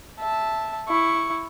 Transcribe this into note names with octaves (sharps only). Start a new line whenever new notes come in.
E5 A5
E4 C#6